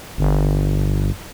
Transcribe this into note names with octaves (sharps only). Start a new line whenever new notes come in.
G1